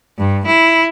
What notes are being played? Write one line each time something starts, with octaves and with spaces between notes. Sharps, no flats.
G2
E4